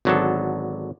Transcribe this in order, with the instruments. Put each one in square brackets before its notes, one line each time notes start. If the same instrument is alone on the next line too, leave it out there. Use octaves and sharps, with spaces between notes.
[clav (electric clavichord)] G#1 D3 F#3 B3 D4 A4